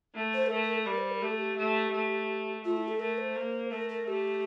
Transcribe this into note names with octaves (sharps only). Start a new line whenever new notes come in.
A3
C5
A4
A3 A#4
A#4
A4
G3 A#4
C5
A#4
A3 G4
A4
G4
A3
A3
A3 F4
E4
A4
A3 A#4
C5
A#3
A3 A#4
A#4
A3 G4